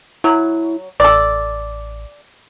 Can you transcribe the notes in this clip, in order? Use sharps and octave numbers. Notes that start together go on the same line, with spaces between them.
F#3 E4
A1 A4 D5